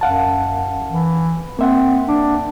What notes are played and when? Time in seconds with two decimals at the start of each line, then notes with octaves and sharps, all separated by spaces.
0.01 F#2 F5 F#5 A5
0.91 E3
1.59 A#3 C4 E5 F#5
2.08 D4